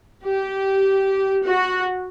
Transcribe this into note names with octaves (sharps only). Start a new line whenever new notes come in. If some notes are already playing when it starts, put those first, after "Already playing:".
G4
F#4